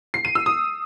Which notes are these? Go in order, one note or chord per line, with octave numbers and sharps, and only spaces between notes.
C7
D#7
E6
D#6